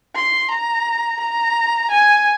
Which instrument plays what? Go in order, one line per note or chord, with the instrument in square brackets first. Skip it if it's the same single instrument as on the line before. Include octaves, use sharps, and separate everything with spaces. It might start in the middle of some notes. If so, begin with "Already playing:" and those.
[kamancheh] C6
A#5
A#5
G#5